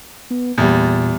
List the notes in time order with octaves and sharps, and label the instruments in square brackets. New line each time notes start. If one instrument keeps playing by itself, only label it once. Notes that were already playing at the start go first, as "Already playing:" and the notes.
[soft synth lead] B3
[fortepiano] E2 G3 [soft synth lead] A#2